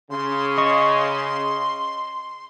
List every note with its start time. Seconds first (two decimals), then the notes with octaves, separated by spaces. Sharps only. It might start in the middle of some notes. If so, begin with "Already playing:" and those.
0.10 C#3 C6
0.58 D#5 C#6